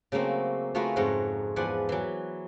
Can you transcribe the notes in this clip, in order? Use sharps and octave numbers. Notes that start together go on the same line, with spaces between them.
C#3 F#3 A3 A#3 C4
A3 F4 F#4 G#4 A#4 B4
F2 G#2 F4 F#4 A#4 C#5
E2 F3 B4 D5 F#5 G#5
E3 F#3